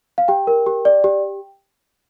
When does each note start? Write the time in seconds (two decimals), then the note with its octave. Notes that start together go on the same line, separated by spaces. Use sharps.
0.18 F5
0.28 G4 G5
0.47 A#4
0.66 G4
0.85 D5
1.04 G4